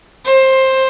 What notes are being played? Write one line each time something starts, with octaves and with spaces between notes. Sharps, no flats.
C5